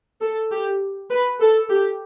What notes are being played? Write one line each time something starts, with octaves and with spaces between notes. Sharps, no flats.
A4
G4
B4
A4
G4